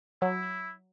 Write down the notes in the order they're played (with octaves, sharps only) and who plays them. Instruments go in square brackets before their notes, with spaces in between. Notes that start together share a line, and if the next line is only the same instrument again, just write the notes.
[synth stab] F#3 [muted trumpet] E4